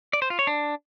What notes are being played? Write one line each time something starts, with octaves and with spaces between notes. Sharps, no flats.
D5
C5
F4
C#5
D4